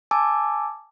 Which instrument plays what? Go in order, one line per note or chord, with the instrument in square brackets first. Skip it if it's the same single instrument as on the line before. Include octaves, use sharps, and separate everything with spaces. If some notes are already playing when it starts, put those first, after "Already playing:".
[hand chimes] G#5 A5 D6 E6